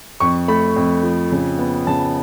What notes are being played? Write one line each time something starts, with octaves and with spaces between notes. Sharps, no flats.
F2 C#6
A3 B5
F2
F3
C#3
B3
C#3 A5